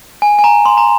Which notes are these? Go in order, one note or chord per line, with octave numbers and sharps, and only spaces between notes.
G#5
G#5
A#5
C6
A#5